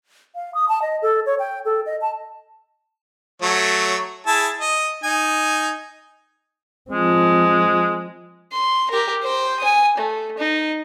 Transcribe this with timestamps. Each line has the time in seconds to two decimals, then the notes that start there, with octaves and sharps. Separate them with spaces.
0.35 F5
0.55 D#6
0.69 A5
0.82 D#5
1.02 A4
1.26 C#5
1.39 G5
1.65 A4
1.86 D#5
2.01 A5
3.42 F#3 A3 C#5
4.27 E4 G#4 A5
4.61 D#5
5.04 D#4 G#5
6.91 F3 G#3 C4
8.52 C6
8.91 G4 A#4
9.23 C5 G5
9.60 G#5 D#6
9.98 A3
10.38 D#4